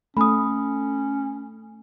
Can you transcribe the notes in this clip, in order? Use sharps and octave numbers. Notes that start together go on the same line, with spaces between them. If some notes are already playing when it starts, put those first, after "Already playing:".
A3 C#4 B5 D#6